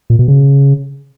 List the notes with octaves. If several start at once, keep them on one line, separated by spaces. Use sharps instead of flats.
A#2
B2
C#3